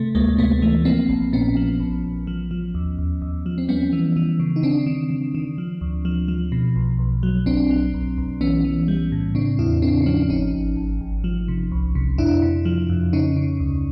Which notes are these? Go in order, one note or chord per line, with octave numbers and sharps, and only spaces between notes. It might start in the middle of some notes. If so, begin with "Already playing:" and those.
Already playing: C3 A3
D2 G#3 A#3
C3 A3 B3
E3 A3
F3 A#3 C4
A#1
A#2 B3 C#4
F3
A#1
A#1
F3
F3
D#2
D#2
D#2
F3
C4
G3 B3 C#4
E3
E3
C#3
D#4
D#3 C4 D4
D#3
D#3
D#3
F3
D2
F3
F3
B2
B1
B1
F#3
B1 C4 D4
F#3
B1
B1
E3 B3 C#4
E3
G3
A2
C#3 C4 D4
E2 D4 E4
C#3 C4 D4
C#4
F3 C4 D4
G#1 C#4 D#4
G#1
G#1
G#1
F3
C3
C2
C3
F2 D4 E4
C3
F3
F2
C#3 C#4 D#4
C#3
D2